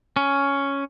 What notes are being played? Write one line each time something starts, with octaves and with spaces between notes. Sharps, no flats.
C#4